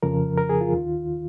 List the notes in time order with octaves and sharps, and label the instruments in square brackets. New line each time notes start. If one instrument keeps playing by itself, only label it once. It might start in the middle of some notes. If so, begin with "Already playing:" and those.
[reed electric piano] F2 C#3 F3 A#4
A#4
G#4
F4
D#2 D#3